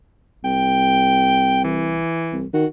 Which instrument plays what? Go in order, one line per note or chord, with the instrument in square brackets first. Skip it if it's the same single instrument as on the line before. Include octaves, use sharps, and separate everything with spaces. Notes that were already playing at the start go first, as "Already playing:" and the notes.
[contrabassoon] C2 [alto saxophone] G5
[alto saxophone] E3
[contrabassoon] C2
[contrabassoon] D#3 [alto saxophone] F#4